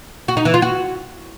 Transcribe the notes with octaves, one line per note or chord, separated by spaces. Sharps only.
F#4
D#4
E3
F4
F#4